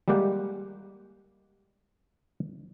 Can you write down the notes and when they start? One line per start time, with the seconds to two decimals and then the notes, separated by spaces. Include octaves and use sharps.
0.08 G3 G#3 A#3 G4 F#5